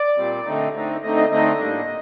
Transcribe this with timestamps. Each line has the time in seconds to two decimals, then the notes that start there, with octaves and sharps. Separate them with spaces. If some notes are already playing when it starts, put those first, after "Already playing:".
Already playing: D5
0.17 A#2 G3 C4
0.46 D3 A3 C4 D#4
0.74 D3 A3 C4 D#4
1.03 D3 A3 C4 D#4 D#5
1.17 D#5
1.31 D3 A3 C4 D#4 D#5
1.59 A2 G3 A#3 D4